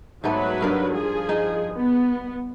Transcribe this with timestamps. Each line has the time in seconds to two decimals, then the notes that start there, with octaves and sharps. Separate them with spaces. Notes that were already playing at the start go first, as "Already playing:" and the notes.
0.24 G#2 F#3 A3 B3 B4
0.61 G2 A#4 F5
0.94 F3 G#4
1.29 D#4 D#5
1.73 B3